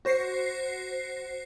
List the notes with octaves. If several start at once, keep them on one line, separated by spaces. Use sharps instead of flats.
F#4 C5 A#6 C7 C#7